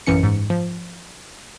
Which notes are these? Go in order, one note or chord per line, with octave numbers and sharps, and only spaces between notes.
A1 F#2 E3 C#4 C#7
G#2
F3